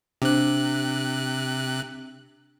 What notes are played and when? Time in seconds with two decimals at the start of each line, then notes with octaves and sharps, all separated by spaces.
0.22 C3 D4 C5 F#6